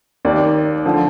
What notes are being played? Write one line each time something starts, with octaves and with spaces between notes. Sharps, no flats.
D#2 D#3 D5
D3 F3